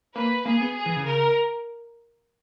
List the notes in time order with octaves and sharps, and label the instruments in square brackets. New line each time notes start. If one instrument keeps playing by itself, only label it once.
[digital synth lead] A#3 [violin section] B4
[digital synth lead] A#3 [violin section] G#4
[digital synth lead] B3
[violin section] G#4
[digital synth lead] E3
C#3
[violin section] A#4